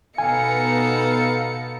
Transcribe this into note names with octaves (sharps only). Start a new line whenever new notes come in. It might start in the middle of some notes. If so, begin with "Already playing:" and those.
B2 B3 D#4 A4 F5 G#5 C#7